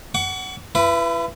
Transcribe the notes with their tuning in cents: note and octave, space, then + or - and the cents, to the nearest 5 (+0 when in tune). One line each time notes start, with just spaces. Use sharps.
F#5 +20 C#6 +45
E4 +35 B4 +0